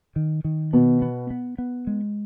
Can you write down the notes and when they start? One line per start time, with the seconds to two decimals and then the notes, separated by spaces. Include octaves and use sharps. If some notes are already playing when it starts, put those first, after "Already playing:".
0.16 D#3
0.44 D#3
0.73 B2 B3
1.02 B3
1.30 B3
1.58 B3
1.87 G#3